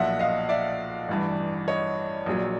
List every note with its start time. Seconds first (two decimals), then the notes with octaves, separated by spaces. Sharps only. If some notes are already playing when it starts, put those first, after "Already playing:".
Already playing: B1 A#2 F3 E5 F#5
0.19 D#5 F5
0.49 D5 E5
1.09 A1 G2 E3
1.68 C#5 D#5
2.26 A#1 A#2 F#3